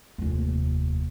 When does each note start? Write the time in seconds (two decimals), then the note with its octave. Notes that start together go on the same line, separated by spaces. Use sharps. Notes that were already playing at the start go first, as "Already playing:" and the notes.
0.18 F1 D#2